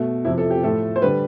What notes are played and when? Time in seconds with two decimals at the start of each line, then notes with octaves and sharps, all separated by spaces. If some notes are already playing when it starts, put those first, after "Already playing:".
Already playing: B2 A3
0.25 F2 C3 F3 E4
0.38 A4
0.50 G4
0.63 A2 F3 A3 A4
0.96 C5
1.02 D3 G3 B4